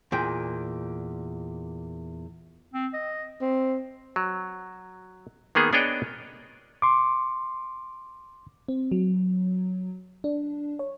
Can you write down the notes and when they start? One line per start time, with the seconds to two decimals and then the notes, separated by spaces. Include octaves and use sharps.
0.12 E2 A#2 G5
2.74 C4
2.93 D#5
3.42 C4
4.16 F#3
5.55 D#3 A#3 B3 G#4
5.73 B3 D4 G#4 C#5 D#5 G5
6.82 C6 D6
8.68 C4
8.92 F#3
10.24 D4
10.79 C#5